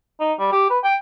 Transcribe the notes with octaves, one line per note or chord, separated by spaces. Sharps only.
D#4
G3
G4
B4
G5